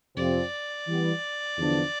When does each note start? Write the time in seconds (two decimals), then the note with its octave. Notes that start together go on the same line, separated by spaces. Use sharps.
0.17 F2 C3 F3 C4 D5
0.87 E3 G3 B3
1.58 E2 D3 F3 B3 D4